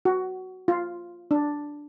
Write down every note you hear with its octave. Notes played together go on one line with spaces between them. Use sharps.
F#4
F4
D4